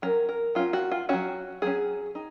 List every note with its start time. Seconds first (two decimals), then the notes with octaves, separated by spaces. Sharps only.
0.02 F#3 C#4 A#4
0.29 A#4
0.55 F#3 C#4 F4
0.73 F#4
0.91 F4
1.09 F#3 C#4 F#4
1.62 F#3 C#4 G#4
2.15 D#4